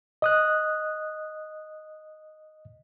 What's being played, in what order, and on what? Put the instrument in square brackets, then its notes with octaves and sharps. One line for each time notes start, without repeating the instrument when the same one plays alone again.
[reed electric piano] D#5 D#6 F#6